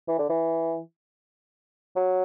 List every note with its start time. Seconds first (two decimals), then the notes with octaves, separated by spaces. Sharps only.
0.08 E3
0.19 D3
0.29 E3
1.96 F#3